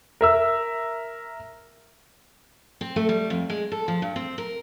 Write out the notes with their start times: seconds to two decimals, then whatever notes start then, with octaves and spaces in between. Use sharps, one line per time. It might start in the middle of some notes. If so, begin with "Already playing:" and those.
0.21 A#4 E5 E6
2.81 C4
2.96 A3
3.09 G3
3.30 F2
3.50 G#3
3.72 A4
3.88 F3
4.02 G2
4.16 C4
4.38 A#4